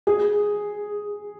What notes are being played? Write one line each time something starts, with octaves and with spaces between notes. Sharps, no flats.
G#4